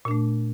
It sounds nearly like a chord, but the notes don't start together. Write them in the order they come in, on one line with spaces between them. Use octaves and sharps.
A#2 D4 A3